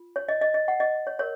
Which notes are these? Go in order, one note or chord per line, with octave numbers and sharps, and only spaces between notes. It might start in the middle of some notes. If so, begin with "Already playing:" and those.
Already playing: F4
C#5
D#5
D#5
D#5
F#5
D#5
C#5
A#4 C#5